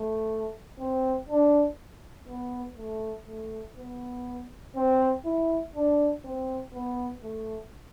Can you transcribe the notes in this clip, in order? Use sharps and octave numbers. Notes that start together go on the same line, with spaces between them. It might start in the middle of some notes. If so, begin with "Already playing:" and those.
Already playing: A3
C4
D4
B3
A3
A3
B3
C4
E4
D4
C4
B3
A3